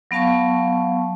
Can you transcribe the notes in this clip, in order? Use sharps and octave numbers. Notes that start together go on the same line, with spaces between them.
F#3 B3 F5 A5 C#6